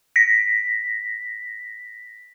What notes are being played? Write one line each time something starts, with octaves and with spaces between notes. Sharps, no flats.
A#6 B6